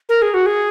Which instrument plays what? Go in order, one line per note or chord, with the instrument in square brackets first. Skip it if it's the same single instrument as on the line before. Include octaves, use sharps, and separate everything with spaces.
[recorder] A#4
G#4
F#4
G#4